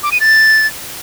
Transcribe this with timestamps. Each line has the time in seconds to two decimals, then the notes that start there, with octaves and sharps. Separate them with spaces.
0.03 D6
0.12 D#7
0.20 A6